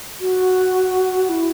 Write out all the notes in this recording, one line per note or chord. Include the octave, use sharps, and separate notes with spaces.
F#4
E4